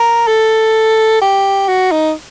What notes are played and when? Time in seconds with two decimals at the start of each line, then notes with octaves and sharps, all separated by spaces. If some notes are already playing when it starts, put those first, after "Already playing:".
Already playing: A#4
0.28 A4
1.21 G4
1.68 F#4
1.92 D#4